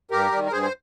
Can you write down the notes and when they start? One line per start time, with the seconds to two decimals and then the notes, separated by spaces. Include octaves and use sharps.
0.11 G2 G4 A#4
0.32 D#3 G3
0.47 A#4
0.52 G2 G#4 C5
0.63 C5